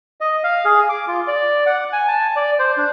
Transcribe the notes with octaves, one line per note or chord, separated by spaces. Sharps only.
D#5
F5
G#4
D6
F4
D5
F#5
G#5
A5
D5
C5
D4